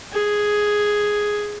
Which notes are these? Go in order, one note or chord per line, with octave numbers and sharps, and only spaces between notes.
G#4